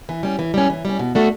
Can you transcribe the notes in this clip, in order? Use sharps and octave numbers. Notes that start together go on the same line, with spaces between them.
E3
G3 C#4
E3
G3 C#4
E3
G3 C#4
B2
A3 D4 F#4